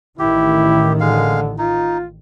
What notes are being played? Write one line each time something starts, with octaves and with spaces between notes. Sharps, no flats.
A1 D#3 E4 G4
D3 G#3 F5
D#4 F4